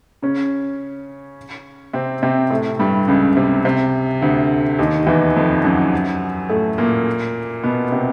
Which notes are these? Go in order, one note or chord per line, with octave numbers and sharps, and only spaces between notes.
C#3 C#4
C3 C4
C3 C4
A2 A3
G2 G3
C#2 C#3
C3
C3
D2 D3
D#2 D#3
E2 E3
F2 F3
F#2 F#3
A2 A3
A#2 A#3
B2 B3
C3 C4